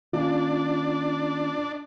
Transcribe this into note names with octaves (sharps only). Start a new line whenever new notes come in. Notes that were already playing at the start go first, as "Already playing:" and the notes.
D#3 A#3 C#4 D4 F4